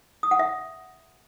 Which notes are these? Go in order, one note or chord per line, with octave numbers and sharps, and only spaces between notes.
D#6
F#5
E5